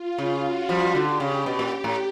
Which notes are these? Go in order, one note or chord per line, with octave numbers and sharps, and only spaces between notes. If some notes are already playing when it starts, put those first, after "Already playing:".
Already playing: F4
C#3
F#4
F3 G3
D3 G4
C#3
B2
A#2
A2